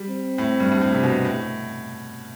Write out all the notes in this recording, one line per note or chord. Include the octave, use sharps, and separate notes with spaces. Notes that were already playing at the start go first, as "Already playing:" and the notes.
Already playing: G3
C4
A2
G2
G2
A2
C3
B2
A2